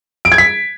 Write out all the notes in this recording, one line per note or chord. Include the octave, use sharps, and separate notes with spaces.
D7
G#6
B6